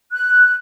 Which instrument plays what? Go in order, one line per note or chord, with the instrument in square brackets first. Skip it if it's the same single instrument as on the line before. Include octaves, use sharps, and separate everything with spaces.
[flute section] F#6